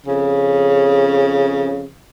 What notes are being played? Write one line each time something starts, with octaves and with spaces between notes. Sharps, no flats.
F2 C#3